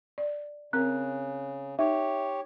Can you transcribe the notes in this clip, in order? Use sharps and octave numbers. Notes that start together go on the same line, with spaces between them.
D5
C#3 C4 A#4 F#6
D#4 G4 C#5 E5